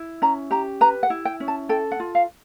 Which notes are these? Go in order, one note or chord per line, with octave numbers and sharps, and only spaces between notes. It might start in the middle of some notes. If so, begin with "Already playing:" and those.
Already playing: E4
C#4 A#5
G4 A#5
B4 A#5
F#5
E4
G5
C#4
A5
A4 G5
F#5
F4
F5